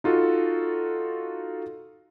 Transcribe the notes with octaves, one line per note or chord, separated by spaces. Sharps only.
D#4 F4 F#4 A4